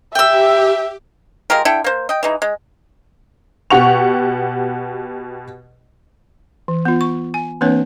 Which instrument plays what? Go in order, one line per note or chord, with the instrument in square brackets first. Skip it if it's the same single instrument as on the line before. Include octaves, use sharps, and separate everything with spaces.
[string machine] G4 [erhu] E5 [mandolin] G5 E6
[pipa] G#3 F4 G4 A#4
D3 E4 A4 G5
A#3 C5
D#5 G5
E3 G#3 D#4
G#3
[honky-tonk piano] B2 G4 F#5 C#6 F7
[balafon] E3
B3 F4
C#6
G#5
E3 A#3 C4 D4 B4 C#5